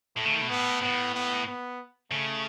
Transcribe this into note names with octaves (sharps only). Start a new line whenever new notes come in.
A2 A3
C#3
D#3
B2
A2 B3
A2 B3
B3
B3
C#3 A3